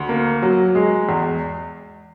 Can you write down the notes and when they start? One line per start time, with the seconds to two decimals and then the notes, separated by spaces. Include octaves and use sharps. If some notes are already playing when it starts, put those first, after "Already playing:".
Already playing: D2
0.09 A#3
0.42 F#3
0.75 G#3
1.09 E2